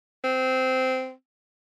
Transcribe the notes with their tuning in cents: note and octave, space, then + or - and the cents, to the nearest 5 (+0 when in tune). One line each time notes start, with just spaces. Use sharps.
C4 -15